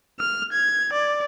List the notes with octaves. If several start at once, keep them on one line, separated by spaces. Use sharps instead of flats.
F6
G#6
D5